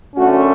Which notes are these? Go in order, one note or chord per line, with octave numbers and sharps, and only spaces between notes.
F#2 D3 A3 C#4 F#4